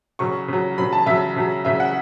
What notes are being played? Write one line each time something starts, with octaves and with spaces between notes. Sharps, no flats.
C#3 F#3 C#6
C#3 F#3
C#3 F#3 B5
A5
C#3 F#3 E5
C#3 F#3
C#3 F#3 E5
F#5